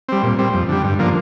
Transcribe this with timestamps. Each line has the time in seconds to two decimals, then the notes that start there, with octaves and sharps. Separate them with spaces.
0.09 G3 C4
0.23 A#2
0.39 G3 C4
0.54 F2
0.69 D3 G3
0.84 G2
0.99 D3 F3 A#3